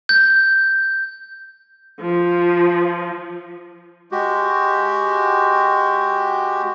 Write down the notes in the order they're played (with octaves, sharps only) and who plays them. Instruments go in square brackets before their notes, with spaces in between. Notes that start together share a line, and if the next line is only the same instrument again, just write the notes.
[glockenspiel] G6
[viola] F3
[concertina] G#3 F#4 G4